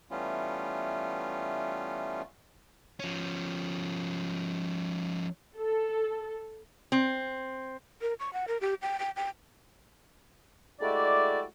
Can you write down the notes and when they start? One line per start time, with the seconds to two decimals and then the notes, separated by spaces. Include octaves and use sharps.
0.11 E3 G3 A3 B3 C#4 F4
3.00 F3 C#4
5.56 A4
6.92 C4
8.02 A#4
8.20 C#6
8.33 F#5
8.48 A#4
8.61 G4
8.82 G5
8.99 G5
9.16 G5
10.81 G#3 A3 E4 F#4 G4 D5